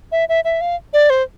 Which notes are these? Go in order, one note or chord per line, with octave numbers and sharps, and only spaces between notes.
E5
E5
E5
F5
D5
C5